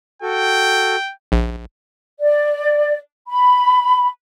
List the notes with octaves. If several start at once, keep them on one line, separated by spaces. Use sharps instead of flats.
F#4 A4 G5
A#1
D5
B5